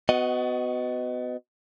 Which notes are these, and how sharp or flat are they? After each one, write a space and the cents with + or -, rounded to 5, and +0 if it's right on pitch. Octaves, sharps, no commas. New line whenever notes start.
B3 +30 F#4 +0 D#5 +0